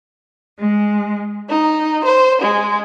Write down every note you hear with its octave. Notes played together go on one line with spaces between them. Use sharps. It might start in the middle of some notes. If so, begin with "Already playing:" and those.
G#3
D#4
C5
G#3